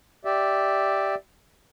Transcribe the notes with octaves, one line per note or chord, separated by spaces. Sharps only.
G4 D5 E5